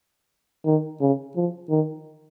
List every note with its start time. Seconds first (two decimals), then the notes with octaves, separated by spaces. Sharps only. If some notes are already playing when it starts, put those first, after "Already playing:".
0.65 D#3
1.01 C#3
1.36 F3
1.70 D#3